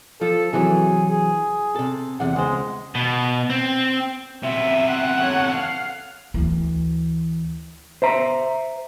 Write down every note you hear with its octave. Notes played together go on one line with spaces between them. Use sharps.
F3 A4
C3 E3 F#3 G#4
G#4
C3 A4
E2 C3 F#5
C#2 G#3 C5
B2
C4
C3 B3 E5
F#5
A4 C#5
F5
D2 E3
C5 E5 A#5